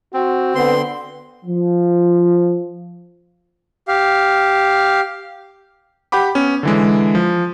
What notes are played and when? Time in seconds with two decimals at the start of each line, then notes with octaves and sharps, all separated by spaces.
0.14 C4 F#4
0.55 D3 B3 C6
1.46 F3
3.88 G4 F5
6.12 G4 F#5 G5 B5 D6
6.35 B3 C#4
6.63 D3 E3 G#3
7.15 F3